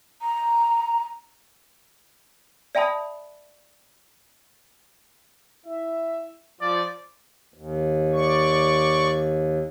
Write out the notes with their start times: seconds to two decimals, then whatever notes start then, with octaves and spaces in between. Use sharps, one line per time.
0.21 A#5
2.75 D5 E5 G5 A5 B5 D#6
5.66 E4 E5
6.61 F3 D5
7.54 D#2
8.13 D5 C#6